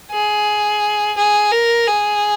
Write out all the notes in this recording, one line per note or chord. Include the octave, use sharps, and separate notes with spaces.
G#4
G#4
A#4
G#4